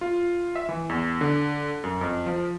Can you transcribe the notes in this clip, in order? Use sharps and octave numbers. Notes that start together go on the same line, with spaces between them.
F4
E5
E3
E2
D3
F#2
F2
F3